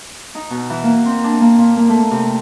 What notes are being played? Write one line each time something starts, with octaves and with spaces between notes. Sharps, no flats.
D#4
B2
E3
A#3
C4
D4
A#3
A#2
A#3
A3
C3